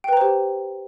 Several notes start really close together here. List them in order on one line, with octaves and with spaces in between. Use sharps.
G5 B4 A#5 C5 G4